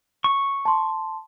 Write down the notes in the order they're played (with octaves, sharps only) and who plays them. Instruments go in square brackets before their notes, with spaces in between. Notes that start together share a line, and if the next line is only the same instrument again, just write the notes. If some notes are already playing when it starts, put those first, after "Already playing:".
[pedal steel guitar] C#6
[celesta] A5 C6